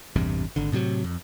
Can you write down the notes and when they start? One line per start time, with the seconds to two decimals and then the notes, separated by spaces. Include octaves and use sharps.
0.16 A1 E2 G2 C3
0.56 G#1 D3
0.72 A2 C3 E3 F#3
1.04 F2